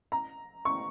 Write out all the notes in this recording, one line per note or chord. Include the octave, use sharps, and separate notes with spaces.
A#5
C#6